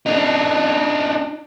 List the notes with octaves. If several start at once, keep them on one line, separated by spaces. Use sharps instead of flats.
D4 D#4